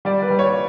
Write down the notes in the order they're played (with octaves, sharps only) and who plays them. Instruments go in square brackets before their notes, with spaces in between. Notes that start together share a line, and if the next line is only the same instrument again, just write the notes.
[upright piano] G3 D5
B4
G3
C#5